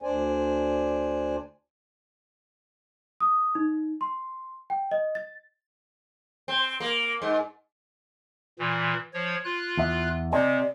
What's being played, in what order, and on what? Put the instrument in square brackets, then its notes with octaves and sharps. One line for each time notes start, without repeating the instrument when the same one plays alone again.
[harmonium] D2 D4 C5 D5 G#5
[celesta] D#6
D#4
C6
G5
D#5
A6
[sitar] C4
A#3
G#2
[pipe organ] A#2 E3
F3 C#5
F4 F#6
[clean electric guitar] E2 E5
[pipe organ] C3 [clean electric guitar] C4 D#5 G#5 [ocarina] D5